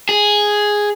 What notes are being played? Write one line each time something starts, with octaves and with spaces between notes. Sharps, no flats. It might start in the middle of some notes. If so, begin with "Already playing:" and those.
G#4